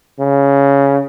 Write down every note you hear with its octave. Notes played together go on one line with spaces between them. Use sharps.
C#3